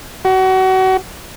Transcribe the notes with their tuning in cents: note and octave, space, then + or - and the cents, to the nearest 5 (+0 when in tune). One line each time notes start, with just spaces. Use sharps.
F#4 +30